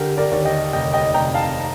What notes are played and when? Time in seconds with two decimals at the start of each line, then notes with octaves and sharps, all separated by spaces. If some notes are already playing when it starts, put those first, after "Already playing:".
Already playing: D3 G4 A#4
0.17 A#4 D5
0.31 D#2
0.45 D#5 G5
0.73 F1 D#5 G5
0.93 D#5 G5
1.14 F1 G5 A#5
1.34 F5 A5